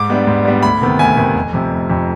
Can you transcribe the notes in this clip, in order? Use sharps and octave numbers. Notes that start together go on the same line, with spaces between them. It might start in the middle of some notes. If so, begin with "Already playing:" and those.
Already playing: G#2 D6
G3 B3 D4
G#2
G3 B3 D4
D2 B5
C3 D#3 B3
D2 G#5
C3 D#3 B3
F1
F2 C3
F1
F2 C3